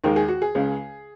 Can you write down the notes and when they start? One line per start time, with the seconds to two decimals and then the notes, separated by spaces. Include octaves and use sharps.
0.04 D#2 D#3 G#3 A#4
0.16 G#4
0.28 F#4
0.42 G#4
0.55 C#2 C#3 G#3